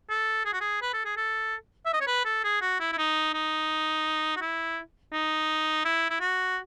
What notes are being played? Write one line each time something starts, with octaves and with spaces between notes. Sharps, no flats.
A4
G#4
F#4
G#4
B4
A4
G#4
A4
E5
D#5
C#5
B4
A4
G#4
F#4
E4
E4
D#4
D#4
F#4
E4
D#4
E4
E4
F#4